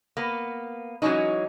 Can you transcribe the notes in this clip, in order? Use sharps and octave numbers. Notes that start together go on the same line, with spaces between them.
A#3 B3
E3 F#3 G#3 C#4 D#4